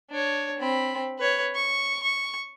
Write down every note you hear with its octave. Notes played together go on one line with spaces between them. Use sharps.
D4 C#5
C4 B5
B4 C#5
C#6
C#6